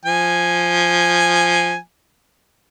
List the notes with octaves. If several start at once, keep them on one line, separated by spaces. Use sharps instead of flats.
F3 G#5